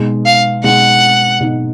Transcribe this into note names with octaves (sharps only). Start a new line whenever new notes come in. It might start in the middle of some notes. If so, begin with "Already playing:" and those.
Already playing: B2 G#3 D#4
F5
B2 G#3 D#4 F#5
B2 G#3 D#4